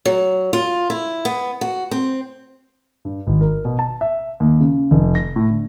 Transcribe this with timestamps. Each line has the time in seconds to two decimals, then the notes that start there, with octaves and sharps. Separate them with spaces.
0.05 F#3
0.53 F4
0.90 E4
1.25 B3
1.61 F#4
1.91 C4
3.05 G2
3.27 G#1
3.41 A#4
3.65 B2
3.79 A5
4.01 E5
4.40 D#2
4.61 C#3
4.91 F1
5.15 A#6
5.36 A2
5.50 D3